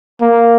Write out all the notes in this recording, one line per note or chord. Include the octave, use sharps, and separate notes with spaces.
A#3